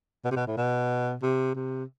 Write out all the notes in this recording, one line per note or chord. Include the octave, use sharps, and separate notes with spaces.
B2
C3
B2
A2
B2
C3
C3